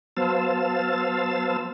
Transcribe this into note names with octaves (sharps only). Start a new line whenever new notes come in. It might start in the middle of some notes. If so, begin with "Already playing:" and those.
F#3 B3 C5 F5 A5 E6